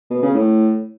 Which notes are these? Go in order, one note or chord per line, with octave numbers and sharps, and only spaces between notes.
B2
C#3
A2